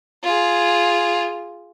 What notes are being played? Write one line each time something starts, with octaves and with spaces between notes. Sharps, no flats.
F4 G#4